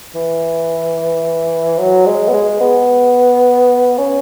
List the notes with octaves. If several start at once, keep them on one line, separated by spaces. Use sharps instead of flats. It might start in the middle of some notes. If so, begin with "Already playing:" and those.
E3
F#3
G#3
B3
G#3
B3
C#4